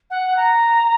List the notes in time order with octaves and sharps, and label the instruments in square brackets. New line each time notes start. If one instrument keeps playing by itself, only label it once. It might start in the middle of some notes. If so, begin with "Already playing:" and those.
[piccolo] F#5
A#5